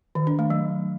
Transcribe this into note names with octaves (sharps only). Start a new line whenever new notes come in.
D#3
D4
A3
F#3